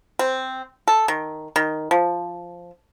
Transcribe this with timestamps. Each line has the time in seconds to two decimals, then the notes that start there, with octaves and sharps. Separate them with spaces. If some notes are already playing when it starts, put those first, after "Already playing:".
0.19 C4
0.88 A4
1.08 D#3
1.56 D#3
1.91 F3